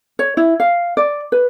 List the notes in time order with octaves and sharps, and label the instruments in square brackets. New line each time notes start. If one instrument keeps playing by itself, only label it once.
[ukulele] C#5
E4
F5
D5
B4